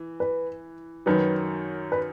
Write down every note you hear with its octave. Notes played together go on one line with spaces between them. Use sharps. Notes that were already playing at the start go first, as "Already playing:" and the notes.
Already playing: E3
B4
F#2 D#3 F#3 B4
B4